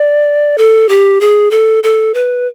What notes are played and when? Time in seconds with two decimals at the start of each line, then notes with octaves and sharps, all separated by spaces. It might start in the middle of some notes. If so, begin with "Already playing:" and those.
Already playing: D5
0.58 A4
0.89 G4
1.21 G#4
1.51 A4
1.83 A4
2.14 B4